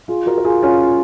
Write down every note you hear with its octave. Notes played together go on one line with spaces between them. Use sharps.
F4 G#4
F#4 A#4
A#4
F4 G#4
C#4 F4